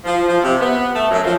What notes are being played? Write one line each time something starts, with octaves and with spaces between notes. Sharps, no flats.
F3
F3
C3
B3
A3
F#2
F3